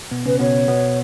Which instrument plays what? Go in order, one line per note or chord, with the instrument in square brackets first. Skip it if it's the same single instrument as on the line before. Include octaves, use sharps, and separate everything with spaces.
[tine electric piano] B2 B3
[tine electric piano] C#3 C#4 [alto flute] B4
[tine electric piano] B2 B3 [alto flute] C#5
[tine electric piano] B2 B3